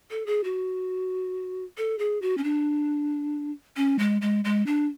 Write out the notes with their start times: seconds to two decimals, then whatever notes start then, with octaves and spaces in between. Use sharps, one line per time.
0.11 A4
0.26 G#4
0.44 F#4
1.78 A4
1.99 G#4
2.22 F#4
2.38 C#4
2.44 D4
3.77 C#4
3.99 G#3
4.22 G#3
4.44 G#3
4.66 D4